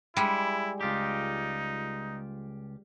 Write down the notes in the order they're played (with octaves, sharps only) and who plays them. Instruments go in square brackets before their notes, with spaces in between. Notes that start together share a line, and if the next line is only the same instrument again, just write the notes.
[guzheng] G3 G#3 [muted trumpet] E4
[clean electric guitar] C#2 F4 G4 [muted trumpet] D#4